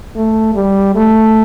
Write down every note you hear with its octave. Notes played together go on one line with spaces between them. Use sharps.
A3
G3
A3